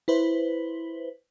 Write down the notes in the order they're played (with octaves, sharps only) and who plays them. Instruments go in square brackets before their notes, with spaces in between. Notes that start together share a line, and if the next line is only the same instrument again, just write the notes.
[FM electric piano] E4 B4 C5